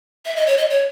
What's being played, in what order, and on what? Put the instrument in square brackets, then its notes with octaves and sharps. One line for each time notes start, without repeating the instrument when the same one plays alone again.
[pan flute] E5
D#5
C#5
D#5
C#5